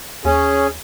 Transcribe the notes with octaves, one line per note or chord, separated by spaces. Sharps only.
D#2 C#4 G#4